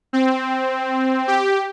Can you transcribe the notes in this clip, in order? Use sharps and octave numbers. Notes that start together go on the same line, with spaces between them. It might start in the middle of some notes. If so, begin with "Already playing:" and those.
C4
G4